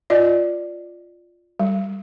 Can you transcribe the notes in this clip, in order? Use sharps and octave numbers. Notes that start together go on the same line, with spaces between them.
F4 D5 D#5
G3